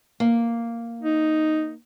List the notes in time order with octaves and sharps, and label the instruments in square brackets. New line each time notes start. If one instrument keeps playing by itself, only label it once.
[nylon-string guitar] A#3
[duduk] D#4